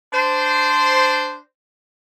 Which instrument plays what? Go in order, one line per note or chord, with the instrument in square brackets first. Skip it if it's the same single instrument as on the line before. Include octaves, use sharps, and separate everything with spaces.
[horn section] D4 C5